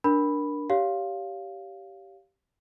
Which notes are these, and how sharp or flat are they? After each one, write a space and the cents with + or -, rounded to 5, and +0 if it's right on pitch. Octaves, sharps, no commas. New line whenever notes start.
D4 +0 A#4 +15 B5 +0
G4 -10 C#5 +30 F5 +0